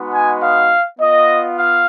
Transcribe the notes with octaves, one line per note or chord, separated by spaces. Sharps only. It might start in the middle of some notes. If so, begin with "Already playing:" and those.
Already playing: G#3 B3 D#4 F#4
G#5
F5
B3 F4 D#5
F5